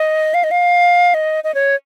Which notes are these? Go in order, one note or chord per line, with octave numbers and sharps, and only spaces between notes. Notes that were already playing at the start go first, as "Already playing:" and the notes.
Already playing: D#5
F5
D#5
F5
D#5
D#5
C#5